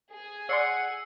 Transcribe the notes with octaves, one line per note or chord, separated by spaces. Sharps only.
G#4
C#5 D5 F#5 C6 E6 C7 C#7